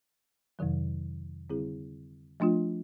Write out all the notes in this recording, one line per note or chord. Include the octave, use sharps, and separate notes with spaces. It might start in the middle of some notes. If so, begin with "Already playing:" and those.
F2 C3 D#3 F#3
D3 G3 C4 E4 G#4
F3 A3 D4 F4